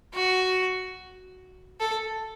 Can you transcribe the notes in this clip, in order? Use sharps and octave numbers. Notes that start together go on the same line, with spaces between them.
F#4
A4